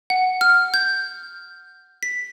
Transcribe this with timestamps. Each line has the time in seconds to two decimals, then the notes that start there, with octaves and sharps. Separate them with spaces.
0.10 F#5
0.41 F6
0.74 G6
2.03 B6